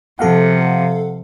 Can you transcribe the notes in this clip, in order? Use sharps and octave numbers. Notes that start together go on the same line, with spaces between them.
C3 F3 A4 F5 F#5